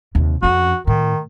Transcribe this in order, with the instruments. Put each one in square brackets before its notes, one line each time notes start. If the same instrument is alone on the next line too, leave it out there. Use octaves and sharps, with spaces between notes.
[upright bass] D#2 C3
[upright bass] F2 C#4 [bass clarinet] F#4
[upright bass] A2 [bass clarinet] D#3